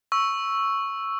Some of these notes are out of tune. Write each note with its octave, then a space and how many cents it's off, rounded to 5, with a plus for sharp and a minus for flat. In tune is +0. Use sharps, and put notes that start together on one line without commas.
C#6 +0 E6 +0